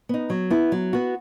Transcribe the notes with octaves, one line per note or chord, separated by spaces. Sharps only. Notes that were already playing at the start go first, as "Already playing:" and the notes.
B3 D#4
F#3
B3 E4
F#3
B3 F#4